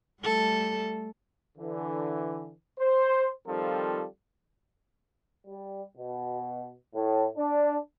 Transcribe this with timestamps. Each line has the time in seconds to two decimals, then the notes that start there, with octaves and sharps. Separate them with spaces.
0.23 G3 A3 A4
1.58 D3 E3
2.79 C5
3.47 D#3 F3 G3 C4 F4 A4
5.47 G3
5.98 B2
6.95 A2
7.38 D4